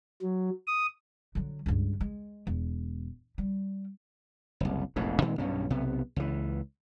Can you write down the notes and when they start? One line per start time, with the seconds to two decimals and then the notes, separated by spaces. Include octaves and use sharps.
0.22 F#3
0.67 D#6
1.35 D3 F#3
1.66 C#2 G2
2.01 G#3
2.47 E1
3.38 G3
4.60 F#1 C2
4.96 E1 A1 F2 G#2
5.22 A#2 D#3 G#3 C4
5.38 B1 G2 B2 C#4
5.70 B1 C3 B3
6.16 C#2 E3